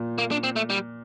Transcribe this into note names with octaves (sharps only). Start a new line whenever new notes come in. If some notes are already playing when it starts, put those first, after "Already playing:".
Already playing: A#2
A#3
D4
C4
A3
G3